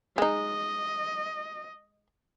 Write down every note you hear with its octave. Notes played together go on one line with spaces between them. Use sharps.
G#3 D#4 D#5